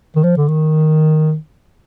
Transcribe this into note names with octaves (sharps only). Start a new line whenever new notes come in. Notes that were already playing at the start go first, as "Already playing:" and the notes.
D#3
F3
D3
D#3